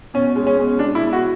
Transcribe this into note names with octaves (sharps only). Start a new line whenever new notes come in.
B2 C#4
G#3
C#4
B2
G#3 D4
E4
B2
F#4